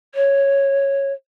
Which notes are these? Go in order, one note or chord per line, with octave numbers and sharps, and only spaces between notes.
C#5